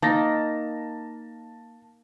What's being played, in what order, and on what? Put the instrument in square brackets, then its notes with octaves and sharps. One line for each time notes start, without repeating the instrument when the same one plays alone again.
[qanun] A#3 D#4 [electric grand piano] A5 A6 A#6